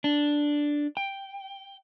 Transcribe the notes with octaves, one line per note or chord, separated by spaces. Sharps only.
D4
G5